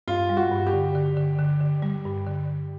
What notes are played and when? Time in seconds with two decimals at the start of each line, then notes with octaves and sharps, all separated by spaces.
0.08 G2 F4
0.29 G3
0.37 F#4
0.51 G2
0.67 G4
0.73 D3
0.95 D3
1.17 D3
1.39 D3
1.61 D3
1.82 G3
2.05 G2
2.27 D3